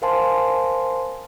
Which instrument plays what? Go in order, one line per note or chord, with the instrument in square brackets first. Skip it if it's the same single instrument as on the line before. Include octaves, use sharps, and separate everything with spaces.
[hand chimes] A#4 C5 F5 G#5 A5 C6